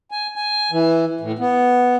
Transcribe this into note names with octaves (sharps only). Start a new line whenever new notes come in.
G#5
G#5
E3
A2
B3